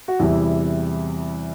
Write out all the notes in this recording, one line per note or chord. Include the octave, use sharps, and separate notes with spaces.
F#4
E2 C3 G3 E4